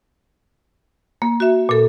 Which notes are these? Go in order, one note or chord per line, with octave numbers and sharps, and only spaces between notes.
A#3
F#4 E5
A#2 A4